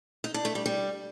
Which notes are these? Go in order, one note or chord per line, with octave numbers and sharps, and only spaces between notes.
D#4
D4
A3
G3
G3